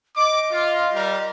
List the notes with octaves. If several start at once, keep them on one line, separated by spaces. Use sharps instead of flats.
D#5 D6
F4
G3 G4 A#4